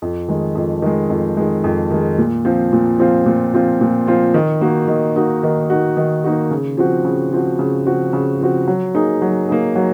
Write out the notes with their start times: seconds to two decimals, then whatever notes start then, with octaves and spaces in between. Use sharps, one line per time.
0.02 F2
0.28 D#3 G#3
0.55 F2
0.82 D#3 G#3
1.10 F2
1.37 D#3 G#3
1.64 F2
1.91 D#3 G#3
2.18 A#2
2.45 F3 C4 F4
2.73 A#2
2.99 F3 C4 F4
3.26 A#2
3.54 F3 C4 F4
3.81 A#2
4.07 F3 C4 F4
4.34 D#3
4.61 A#3 D#4 F#4
4.88 D#3
5.16 A#3 D#4 F#4
5.43 D#3
5.70 A#3 D#4 F#4
5.97 D#3
6.24 A#3 D#4 F#4
6.51 C#3
6.77 F3 C4 F#4
7.05 C#3
7.33 F3 C4 F#4
7.59 C#3
7.86 F3 C4 F#4
8.13 C#3
8.41 F3 C4 F#4
8.67 F#3
8.95 A#3 D#4 G#4
9.22 F#3
9.49 A#3 D#4 G#4
9.76 F#3